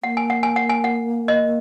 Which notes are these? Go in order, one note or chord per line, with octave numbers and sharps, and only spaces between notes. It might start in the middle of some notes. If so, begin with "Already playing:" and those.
A#3 F#5
G#5
F#5
G#5
F#5
G#5
F#5
D#5